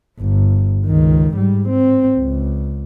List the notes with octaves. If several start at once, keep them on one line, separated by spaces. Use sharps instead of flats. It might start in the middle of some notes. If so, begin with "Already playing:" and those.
G1
C#2 D#3
G#2 G3
C4
C#2